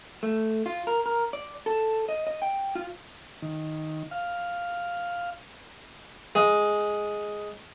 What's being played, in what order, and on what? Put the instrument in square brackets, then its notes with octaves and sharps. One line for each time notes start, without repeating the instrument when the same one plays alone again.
[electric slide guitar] A3
F4
A#4
A#4
D5
A4
D#5
D#5
G5
F4
[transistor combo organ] D#3
F5
[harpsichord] G#3